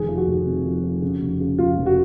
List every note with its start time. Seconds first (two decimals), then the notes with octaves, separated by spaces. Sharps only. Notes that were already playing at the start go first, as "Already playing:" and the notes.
Already playing: F1 D#3 G#4
0.09 F3
0.17 F#4
0.27 F1
0.46 C3
0.65 F3
0.84 F3
1.02 C#3
1.21 F1
1.40 C#3
1.58 F1 F4
1.77 F1
1.86 F#4